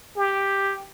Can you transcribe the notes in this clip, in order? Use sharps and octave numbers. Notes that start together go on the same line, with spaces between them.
G4